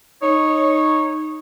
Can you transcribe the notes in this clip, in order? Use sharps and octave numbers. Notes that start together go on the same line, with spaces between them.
D#4 C#5